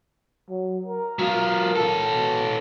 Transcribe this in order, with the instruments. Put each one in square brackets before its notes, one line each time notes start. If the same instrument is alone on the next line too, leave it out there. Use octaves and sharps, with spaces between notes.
[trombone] F#3
A#4
[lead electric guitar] F#3 F4
C#4 A4
[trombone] B2